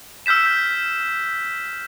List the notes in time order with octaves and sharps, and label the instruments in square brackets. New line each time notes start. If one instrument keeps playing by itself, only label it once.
[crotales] E6 F6 G6 B6 E7